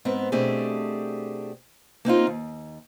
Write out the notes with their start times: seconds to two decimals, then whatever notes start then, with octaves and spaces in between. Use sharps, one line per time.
0.05 G#2 B3 C4
0.32 B2 A3 C4 D4 G4 G#4
2.05 A#3 C4 D#4 F4
2.27 D#2